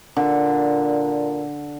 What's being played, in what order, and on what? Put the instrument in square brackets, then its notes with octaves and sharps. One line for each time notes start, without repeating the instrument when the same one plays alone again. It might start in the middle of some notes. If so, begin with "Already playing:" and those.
[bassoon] A#2 [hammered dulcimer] D3